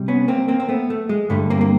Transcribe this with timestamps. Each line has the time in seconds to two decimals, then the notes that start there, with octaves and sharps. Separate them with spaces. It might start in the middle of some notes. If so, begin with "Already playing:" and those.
Already playing: C3 G3
0.08 B3 C#4
0.28 A#3 C4
0.48 A#3 C4
0.60 C4
0.69 A3 B3
0.90 A3
1.09 G#3
1.30 G2 D3 G3 A3
1.50 A#3 C4
1.61 A#3